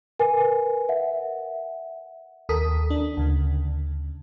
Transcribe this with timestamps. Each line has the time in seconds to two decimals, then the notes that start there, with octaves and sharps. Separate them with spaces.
0.19 A#4 B4 G#5
0.89 E5 F#5
2.49 D#2 A4 A#4 D#6 B6
2.90 D4
3.17 D2 C#3